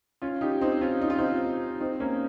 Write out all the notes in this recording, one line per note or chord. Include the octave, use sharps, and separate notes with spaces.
C#4 F4
D#4 G4
C4 D#4
C#4 F4
D#4
F4
C4 D#4
C4 D#4
A#3 C#4